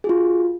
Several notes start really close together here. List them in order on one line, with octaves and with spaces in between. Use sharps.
G#4 F#4 F4